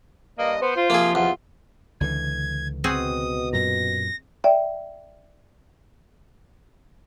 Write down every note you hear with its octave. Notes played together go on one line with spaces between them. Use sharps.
G2 A#3 D#5
B3 C5
F4
C3 F3 A#3 G#4
E2 F4
C#2 D3 E3 G#6
B2 C4 F#4 G#4 D#6
F#2 A#2 A#6
D5 E5 G5